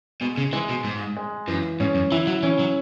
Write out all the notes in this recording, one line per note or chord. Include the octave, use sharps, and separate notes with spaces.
B2 G#3
C#3
E3 G#3
B2
G#2
G#3
F#2 E3
G#2 C#4
F#2
E3 E4
F#3
E3 C#4
F#3